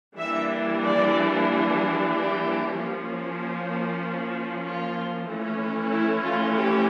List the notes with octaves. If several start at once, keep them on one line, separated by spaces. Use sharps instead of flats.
E3 G3 A#3 D4 E5
D5
G4
F3 A#3 C#4
F4
E3 A3 C#4
E4
F4
G4